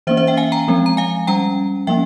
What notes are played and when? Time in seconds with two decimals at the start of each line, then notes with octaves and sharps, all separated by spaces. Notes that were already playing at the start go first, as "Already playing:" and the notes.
0.07 E3 A#3 C#4 C5 E5
0.17 C5 E5
0.27 E5 G5
0.37 F5 G#5
0.52 G5 A#5
0.68 F3 G#3 C4
0.86 A#5
0.97 F5 G#5
1.27 G3 C#4 G5 A#5
1.87 F3 A#3 C#4 E5 G5